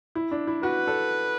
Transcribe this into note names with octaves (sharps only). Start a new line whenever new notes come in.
E4
D4
E4
F#4 B4
A4